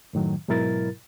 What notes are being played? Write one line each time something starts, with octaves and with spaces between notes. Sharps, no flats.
F#2 A2 D#3 F#3
G#2 B2 F#3 E4 A#4 A6